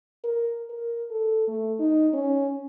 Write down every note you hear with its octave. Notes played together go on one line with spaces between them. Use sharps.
A#4
A#4
A4
A3
D#4
C#4